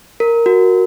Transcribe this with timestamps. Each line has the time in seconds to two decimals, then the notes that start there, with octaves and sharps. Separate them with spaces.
0.20 A#4
0.46 F#4